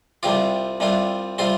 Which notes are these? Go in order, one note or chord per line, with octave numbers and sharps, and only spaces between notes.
C2 C3 G3 C4 F4 D6
C2 C3 G3 C4 F4
C3 G3 C4 F4 C6